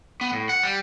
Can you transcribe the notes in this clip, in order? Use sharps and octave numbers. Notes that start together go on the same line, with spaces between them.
B3
A2
F#5
G3